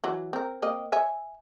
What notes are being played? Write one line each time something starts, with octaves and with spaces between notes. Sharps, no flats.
E3 F#3
C4 A#4
A#3 C4 D#5
C#5 E5 G#5